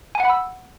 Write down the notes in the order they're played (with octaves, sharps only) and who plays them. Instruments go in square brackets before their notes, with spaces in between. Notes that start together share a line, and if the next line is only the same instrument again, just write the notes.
[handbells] G#5
F#5
B5
E6